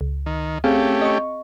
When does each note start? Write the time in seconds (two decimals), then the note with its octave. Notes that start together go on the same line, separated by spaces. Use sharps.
0.01 C#2
0.26 D#3
0.64 A3 C4 C#4 G4 G#4 F5
1.02 D#5 C#6